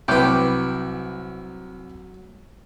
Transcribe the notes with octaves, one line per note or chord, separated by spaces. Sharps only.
C2 F#3 B4 G5 D6